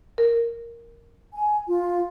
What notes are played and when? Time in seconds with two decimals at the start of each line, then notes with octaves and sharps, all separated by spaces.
0.18 A#4
1.34 G#5
1.67 F4